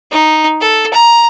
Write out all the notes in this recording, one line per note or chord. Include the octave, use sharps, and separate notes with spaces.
D#4
A4
A#5